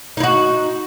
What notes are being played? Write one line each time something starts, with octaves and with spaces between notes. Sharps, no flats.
D#4 E4 F#4